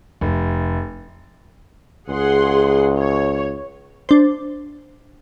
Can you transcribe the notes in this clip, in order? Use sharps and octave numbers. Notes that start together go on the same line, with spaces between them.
F1
C#2 G#4 F#5 C6
C#5
D4 C5